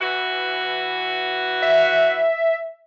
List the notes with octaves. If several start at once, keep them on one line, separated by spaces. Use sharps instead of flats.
E3 F#4
E5